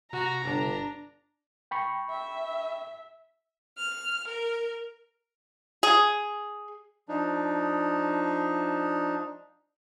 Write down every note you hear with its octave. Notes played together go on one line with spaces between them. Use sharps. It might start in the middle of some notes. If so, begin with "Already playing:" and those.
C3 F#4 A#5
G1 D4
G5 B5 C#6
E5
F6
A#4
G#4
F3 D4 D#4